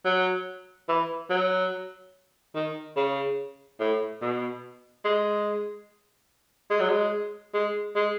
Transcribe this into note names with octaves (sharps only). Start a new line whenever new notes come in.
F#3
E3
F#3
D#3
C#3
A2
B2
G#3
G#3
F#3
G#3
G#3
G#3